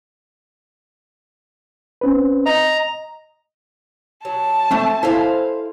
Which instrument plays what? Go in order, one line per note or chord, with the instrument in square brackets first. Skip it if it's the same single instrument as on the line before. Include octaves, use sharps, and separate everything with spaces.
[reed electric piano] C4 C#4 B4
[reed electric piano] D#5 [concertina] A#5
[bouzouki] F#3 [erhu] A5
[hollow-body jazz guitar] A3 C4
[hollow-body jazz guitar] E4 A4 G#5 [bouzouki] C5 F5